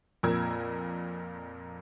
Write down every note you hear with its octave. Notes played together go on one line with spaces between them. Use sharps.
F2 A#2 A#4 E6 G#6